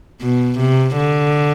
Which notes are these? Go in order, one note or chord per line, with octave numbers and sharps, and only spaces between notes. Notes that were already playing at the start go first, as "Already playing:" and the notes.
B2
C3
D3